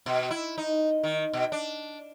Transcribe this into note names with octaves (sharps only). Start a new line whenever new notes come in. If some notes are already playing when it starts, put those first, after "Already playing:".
B2
E4
D#4
D#3
B2
D4